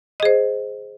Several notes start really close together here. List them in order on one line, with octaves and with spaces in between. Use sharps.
D#5 G#4 C5